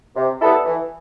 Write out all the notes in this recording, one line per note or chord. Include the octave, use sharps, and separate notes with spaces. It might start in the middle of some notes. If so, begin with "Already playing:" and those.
C3
G3 B3 E4 A4
E3